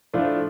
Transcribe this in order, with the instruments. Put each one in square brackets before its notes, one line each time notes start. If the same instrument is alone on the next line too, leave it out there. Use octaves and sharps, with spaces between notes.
[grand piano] A2 F3 A3 D4 F4